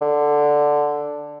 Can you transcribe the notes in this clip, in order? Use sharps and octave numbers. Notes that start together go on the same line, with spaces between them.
D3